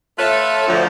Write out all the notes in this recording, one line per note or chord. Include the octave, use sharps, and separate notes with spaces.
A3 F4 A4 B4 C#5 E5
D2 F3